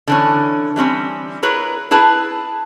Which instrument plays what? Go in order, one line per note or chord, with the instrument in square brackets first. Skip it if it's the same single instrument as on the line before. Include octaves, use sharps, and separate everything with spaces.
[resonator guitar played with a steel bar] D3 E3 C#4
E3 G3 C4 C#4
E4 G#4 A#4 B4 C#5
E4 G#4 B4 A5